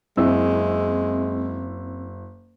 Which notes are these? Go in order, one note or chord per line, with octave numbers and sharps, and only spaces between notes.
F#1 G#3 C4 E4 E6